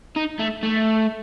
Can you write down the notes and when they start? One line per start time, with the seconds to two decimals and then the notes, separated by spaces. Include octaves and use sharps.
0.16 D#4
0.40 A3
0.63 A3